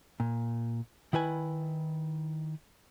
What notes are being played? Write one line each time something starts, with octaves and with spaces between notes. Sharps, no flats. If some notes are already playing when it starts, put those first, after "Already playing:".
A#2
D#3 E4 B4 G#5